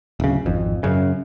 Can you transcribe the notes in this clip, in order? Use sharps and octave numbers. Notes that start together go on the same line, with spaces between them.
D1 C#3
G#1 F2
F#2 C#3